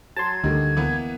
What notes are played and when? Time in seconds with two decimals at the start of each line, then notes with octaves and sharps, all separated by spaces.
0.17 F#3 A5 C6 G#6
0.44 D2 D3 D#3 G3
0.77 E3 A#3 B3